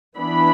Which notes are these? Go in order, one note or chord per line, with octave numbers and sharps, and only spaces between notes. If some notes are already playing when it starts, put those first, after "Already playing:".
E3 B3 D4 B5